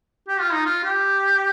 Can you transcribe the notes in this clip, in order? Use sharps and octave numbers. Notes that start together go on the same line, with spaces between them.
G4
F4
D#4
F4
G4